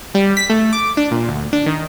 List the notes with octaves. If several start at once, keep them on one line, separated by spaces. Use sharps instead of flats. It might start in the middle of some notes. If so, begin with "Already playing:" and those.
G3
B6
A3
D6
D4
A#2
D2
D4
D#3